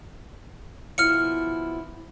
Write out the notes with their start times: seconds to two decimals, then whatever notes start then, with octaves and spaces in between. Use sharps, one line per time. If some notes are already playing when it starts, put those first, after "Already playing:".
0.98 B2 F3 E4 F6 C#7